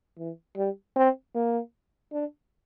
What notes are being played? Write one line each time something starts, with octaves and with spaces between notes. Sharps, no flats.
E3
G3
C4
A#3
D4